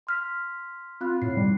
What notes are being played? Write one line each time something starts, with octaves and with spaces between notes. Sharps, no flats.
C6 F6 B6
C4 F4 B5 F#6
A2 C7
G3 D#4